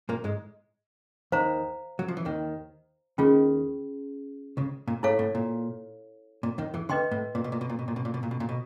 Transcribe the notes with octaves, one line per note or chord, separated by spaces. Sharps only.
A#2 A#3
G#2 G#3
D#2 D#3 C5 F5 A#5
F#3
F3
E3
D#2 D#3
D#2 D#3 C#4 F4 G#4
C#2 C#3
A#2
A2 E4 A4 C#5 F5
A2
A#2
A#2
D#2 D#3
E2 E3
D2 D3 B4 D#5 G5 C6
A2
A#2
B2
A#2
B2
A#2
B2
A#2
B2
A#2
B2
A#2
B2
A#2
B2